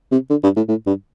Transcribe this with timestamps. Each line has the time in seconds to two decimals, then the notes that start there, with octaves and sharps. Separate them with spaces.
0.12 C3
0.30 D3
0.44 G2
0.56 A2
0.69 A2
0.87 G2